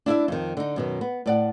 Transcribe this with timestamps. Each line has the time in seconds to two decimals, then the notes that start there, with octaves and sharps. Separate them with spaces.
0.06 D4 E4 D#5 E5
0.28 F2 D#3
0.57 D3 D#4
0.76 F#2 B2 D#3
1.01 B3
1.26 A2 D5 F#5